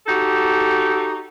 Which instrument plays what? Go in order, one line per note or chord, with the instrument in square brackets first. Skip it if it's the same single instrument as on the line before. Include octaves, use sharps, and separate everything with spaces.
[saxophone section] D#4 F#4 G4 A4